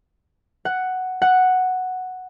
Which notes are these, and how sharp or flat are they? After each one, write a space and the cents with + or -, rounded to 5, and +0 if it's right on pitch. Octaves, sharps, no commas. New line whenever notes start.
F#5 +5
F#5 +0